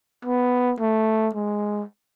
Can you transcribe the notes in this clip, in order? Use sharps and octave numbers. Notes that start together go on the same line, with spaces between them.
B3
A3
G#3